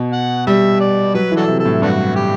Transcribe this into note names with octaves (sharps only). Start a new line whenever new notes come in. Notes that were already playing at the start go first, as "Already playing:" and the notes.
Already playing: B2
F#5
G3 E5
D5
F#3 B4
E3
D4 F#4 A4
C3
A4
A2
G2 A3 D4 F#4
G4